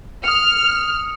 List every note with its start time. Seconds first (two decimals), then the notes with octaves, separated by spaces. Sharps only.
0.24 D#6 F6 C#7